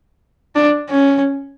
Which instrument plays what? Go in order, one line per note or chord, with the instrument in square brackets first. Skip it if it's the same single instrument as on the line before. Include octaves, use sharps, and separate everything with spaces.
[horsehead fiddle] D4
C#4